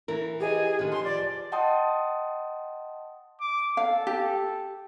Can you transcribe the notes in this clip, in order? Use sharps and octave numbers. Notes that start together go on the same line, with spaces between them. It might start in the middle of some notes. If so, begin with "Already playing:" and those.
E3 A#4
G4 G#4 B4 D#5
D3 D#3
F3 C6
D5
D#5 F#5 G5 A5 C6 D#6
D6
A4 F5
G4